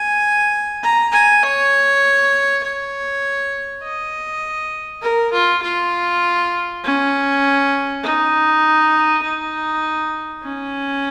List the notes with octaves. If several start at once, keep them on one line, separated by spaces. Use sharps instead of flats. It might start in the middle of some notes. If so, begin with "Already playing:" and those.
Already playing: G#5
A#5
G#5
C#5
C#5
D#5
A#4
F4
F4
C#4
D#4
D#4
C#4